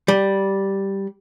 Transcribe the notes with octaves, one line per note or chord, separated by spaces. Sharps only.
G3